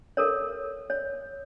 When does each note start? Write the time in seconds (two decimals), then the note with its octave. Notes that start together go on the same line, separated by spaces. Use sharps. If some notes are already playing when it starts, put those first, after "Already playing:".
0.17 A4 A#4 C#5
0.90 C#5